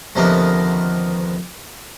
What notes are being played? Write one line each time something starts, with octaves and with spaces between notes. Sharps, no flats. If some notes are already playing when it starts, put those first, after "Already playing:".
D2 C3 D#3 F3 A#3 B3